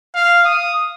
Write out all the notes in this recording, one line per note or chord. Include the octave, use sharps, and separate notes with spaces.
F5
D#6